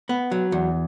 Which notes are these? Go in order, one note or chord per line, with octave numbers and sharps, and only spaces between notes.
B3
F#3
E2